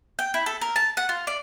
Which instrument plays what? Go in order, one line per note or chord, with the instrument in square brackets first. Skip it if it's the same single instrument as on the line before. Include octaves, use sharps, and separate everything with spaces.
[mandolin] G5
E4
A4
A#4
A5
F#5
F4
D5